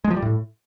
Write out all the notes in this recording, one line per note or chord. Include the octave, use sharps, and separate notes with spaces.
G#3
F3
G3
A2